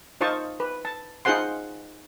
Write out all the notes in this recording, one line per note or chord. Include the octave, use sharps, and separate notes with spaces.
D#4 F4 C5 D#5 A5 C#6
B4
A5
D#4 F4 G#4 C5 F#5 C6